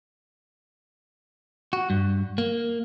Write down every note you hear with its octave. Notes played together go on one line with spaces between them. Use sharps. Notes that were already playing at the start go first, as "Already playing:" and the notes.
F#4
G2
A#3